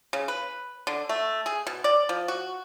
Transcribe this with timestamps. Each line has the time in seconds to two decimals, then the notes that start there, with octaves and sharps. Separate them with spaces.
0.13 C#3
0.28 B4
0.87 D3
1.09 A3
1.46 G#4
1.67 B2
1.84 D5
2.09 F3
2.28 F#4